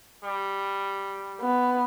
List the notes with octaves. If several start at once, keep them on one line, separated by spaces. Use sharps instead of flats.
G3
B3